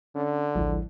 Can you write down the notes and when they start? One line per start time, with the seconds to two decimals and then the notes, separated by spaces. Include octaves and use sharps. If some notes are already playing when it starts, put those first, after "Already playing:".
0.16 D3 C#4
0.55 A1 D2 F3 G#3 E4